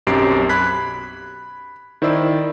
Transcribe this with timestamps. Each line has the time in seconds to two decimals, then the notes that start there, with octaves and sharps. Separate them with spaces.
0.07 B1 F#2 C4 G4 C7 D7
0.49 B5 F#6 G#6 B6
2.02 D#3 E4 C5 D5 E6